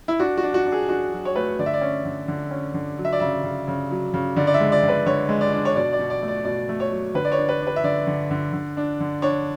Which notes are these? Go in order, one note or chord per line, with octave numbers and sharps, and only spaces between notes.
E4
D4 F#4
F#4
D4
F#4
D4
G#4
D4 F#4
F#3
C#5
A3 B4
D3 D5
E5
D5
C#4
D3
D3
C#4
D3
F#3
E5
D5
C#3 E5
C#3
C#3
F#3
C#3
D3 D5
D5
E5
G#3
D5
D3
B4
D3 C#5
G#3
D5
D4
C#5
B2 D5
D5
B2
D5
A3
D5
B2 D5
A3
C#5
F#3
D3 B4
D5
C#5
D4
B4
D4
B4
E5
D3 D5
D3
D3
D3
D4
D3
D4 C#5